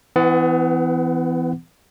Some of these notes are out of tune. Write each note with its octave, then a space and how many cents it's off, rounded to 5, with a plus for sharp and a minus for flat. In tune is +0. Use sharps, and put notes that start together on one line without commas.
E3 +0 B3 +40 F#5 +0